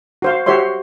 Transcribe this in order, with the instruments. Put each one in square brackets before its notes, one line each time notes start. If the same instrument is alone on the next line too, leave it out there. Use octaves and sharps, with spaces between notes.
[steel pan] F#4 C5 F5
F#4 G4 C5 C#5 E5 C6